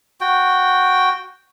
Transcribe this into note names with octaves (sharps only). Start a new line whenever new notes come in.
F#4 G5